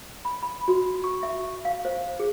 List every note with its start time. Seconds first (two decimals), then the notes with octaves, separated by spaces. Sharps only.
0.25 B5
0.43 B5
0.68 F#4
1.04 C#6
1.23 E5
1.65 F5
1.85 C5
2.20 G#4